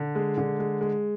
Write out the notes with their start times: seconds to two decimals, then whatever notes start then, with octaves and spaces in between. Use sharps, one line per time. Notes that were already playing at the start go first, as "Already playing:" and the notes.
Already playing: D3
0.15 G#3
0.38 D3
0.59 G#3
0.81 G#3